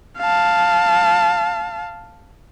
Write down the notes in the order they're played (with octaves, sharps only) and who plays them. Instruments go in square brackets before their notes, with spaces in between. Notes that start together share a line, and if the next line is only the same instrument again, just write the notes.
[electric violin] F5 A5